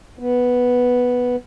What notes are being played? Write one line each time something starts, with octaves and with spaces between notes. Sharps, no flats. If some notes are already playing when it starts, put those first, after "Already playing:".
B3